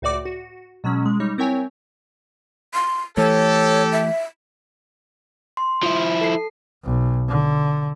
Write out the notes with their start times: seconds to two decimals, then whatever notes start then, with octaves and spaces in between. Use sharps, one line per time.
0.02 C#2 A2 F#4 D5 D6
0.25 F#4
0.84 B2 F#3 G#3 C#4
1.06 G#3
1.20 G3 D#4 C#5
1.38 C4 E4 A#4 C#5 G5 G#5
2.74 C6
3.17 E3 A3 G4 A4 C#5
3.92 E5
5.57 C6
5.83 F3 E4
6.21 A4 C7
6.85 B1
7.29 D3